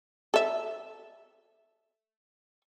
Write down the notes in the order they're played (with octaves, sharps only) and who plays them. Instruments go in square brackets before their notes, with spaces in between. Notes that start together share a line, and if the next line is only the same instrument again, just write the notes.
[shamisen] A4 E5